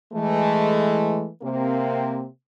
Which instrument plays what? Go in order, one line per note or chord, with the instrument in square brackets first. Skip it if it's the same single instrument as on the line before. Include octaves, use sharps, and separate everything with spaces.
[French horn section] E3 G#3 A3
C3 A#3 C4